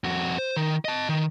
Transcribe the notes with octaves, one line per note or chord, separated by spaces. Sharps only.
F2 F#4
C5
D#3
D#5 A5
D#3